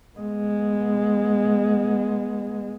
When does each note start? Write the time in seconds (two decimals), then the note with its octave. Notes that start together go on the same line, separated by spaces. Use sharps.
0.17 G#3 B3